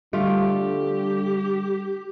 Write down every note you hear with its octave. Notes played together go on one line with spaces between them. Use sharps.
D3 G3 A3 F4 G4